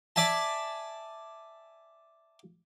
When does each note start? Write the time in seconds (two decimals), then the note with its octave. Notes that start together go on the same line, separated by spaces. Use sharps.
0.16 D5 E5 G#5 A5